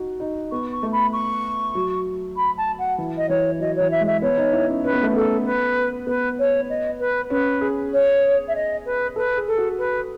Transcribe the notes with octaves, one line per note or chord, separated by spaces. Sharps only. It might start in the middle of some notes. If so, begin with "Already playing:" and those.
Already playing: D#4 F#4
D#4
B3 C#6
C#6
A3
B5
C#6
F#3
B5
A5
F#5
E3
D#5
E3 C#5
F#3 D#5
E3 C#5
E5
G#3
E5
B3 C#5
D#4
E4
C#4
C#4 B4
B3
A3
B3 A4
B4
B3 B4
C#5
D#5
B4
C#4 B4
G#4
C#5
E5
D#5
B4
A4 B4
G#4
A4
F#4
B4